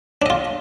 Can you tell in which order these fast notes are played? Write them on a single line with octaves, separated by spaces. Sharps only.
D4 D#5 F4